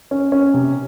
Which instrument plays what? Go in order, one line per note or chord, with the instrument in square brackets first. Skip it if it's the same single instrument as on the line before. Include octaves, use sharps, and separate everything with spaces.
[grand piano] C#4
C#4
C3